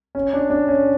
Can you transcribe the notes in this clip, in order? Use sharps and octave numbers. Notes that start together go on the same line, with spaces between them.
C#4
D4
D4
C#4